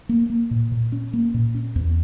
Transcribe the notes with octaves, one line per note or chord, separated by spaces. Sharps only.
A#3
A#3
A#2
A#2
C#4
A#3
A#2
C#4
E2